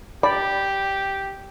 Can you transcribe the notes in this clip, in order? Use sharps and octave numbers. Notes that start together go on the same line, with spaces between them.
G4 D5 B5